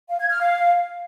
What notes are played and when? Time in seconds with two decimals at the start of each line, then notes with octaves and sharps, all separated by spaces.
0.10 F5
0.20 G#6
0.30 F6
0.40 F5